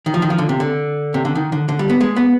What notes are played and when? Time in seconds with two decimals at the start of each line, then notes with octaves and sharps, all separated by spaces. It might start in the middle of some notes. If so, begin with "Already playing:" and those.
0.06 D#3
0.14 F3
0.22 D#3
0.30 F3
0.38 D3
0.49 C3
0.60 D3
1.14 C3
1.25 D3
1.35 D#3
1.52 D3
1.69 D3
1.79 G3
1.89 B3
2.00 G#3
2.16 B3